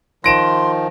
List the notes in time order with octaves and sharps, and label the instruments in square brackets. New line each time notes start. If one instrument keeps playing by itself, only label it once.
[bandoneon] D#3 F3 [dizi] C6 [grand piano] A#6 D7 E7